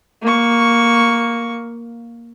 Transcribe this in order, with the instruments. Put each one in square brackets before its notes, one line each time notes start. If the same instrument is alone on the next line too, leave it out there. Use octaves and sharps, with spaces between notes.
[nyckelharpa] A#3 C#6